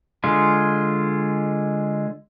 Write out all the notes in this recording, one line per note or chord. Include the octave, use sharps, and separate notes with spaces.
D3 G#3 F4